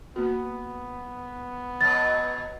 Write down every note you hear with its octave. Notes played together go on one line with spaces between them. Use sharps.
A#3 B3 F#4
B2 F#3 A6